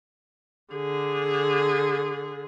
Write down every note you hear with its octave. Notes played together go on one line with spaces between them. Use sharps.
D3 G#4